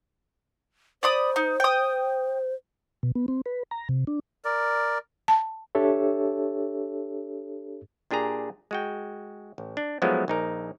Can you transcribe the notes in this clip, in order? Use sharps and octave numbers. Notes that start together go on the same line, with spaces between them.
C5 D5 B5 D#6
D#4
G5 D#6
B2
B3
C4
B4
A#5
C3
D4
A#4 D5
A5
D4 G4 A4 C#5 E5
A#2 D4 G4 G#4 A#5
G#3 F#4 G5
A1
D4
F3 F#3 G#3 A3 B3 D#4
A#1 D#4 A#4